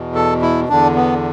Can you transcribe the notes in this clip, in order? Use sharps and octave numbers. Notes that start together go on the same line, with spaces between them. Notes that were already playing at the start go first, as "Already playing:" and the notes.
Already playing: E2 B2
A4
E4
E2 D3 D4
B3